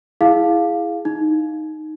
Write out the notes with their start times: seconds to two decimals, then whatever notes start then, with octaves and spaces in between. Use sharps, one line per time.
0.21 E4 G#4 F5
1.05 D#4